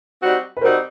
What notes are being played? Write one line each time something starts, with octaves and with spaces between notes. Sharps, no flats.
G3 C4 D#4 F#4
B4
G3 C4 D#4 F#4 A#4 C5